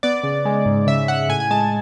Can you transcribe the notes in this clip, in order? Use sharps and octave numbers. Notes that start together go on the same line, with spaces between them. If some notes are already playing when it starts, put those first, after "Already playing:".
B3 D5
C#3
G#3
G#2
C#3 E5
C#3 F#5
A2 G#5
G#5
G#3 A5